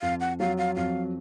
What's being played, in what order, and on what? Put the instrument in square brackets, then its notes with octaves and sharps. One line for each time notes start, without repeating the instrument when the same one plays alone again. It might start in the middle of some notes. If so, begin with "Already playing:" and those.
[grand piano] F2 [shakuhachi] F5
[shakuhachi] F#5
[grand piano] F#3 [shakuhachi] F5
[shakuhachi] F5
[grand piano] F2 [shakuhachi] F5